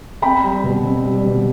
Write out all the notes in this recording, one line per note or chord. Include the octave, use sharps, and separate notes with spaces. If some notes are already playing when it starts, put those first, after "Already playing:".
C4 G5 B5
G3
B2
C4
G3
B2